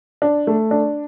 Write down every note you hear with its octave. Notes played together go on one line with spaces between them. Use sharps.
D4
A3
D4